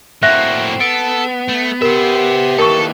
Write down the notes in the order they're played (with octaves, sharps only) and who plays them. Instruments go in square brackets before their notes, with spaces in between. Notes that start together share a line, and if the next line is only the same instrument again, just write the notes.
[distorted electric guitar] A2 A#3 [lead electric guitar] C4 F#4 [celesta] E5 F#6 A#6
[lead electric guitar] B3 [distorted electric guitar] A4 [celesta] D7
[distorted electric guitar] A3
[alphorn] G4 [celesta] A#4 [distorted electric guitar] C5 E5
[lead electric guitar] D#2 E3 [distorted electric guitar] A4 [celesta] A#4 C#6